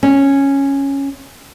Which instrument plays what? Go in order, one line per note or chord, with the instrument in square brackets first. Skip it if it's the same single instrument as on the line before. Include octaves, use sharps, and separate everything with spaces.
[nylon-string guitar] C#4